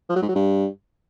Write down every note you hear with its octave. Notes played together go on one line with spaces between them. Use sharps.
F3
F#3
G#2
F#3
G2